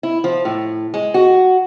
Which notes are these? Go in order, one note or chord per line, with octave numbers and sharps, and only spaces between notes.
E4
F3
A2
G#3
F#4